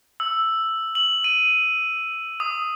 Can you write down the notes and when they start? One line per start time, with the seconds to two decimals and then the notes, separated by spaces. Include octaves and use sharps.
0.20 E6
0.95 F#7
1.24 D#7
2.40 D#6